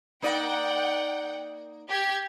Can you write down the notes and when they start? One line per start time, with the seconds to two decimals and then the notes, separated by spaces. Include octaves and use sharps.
0.22 A#3 D#4 D5 F#5 G5
1.89 G4 G#6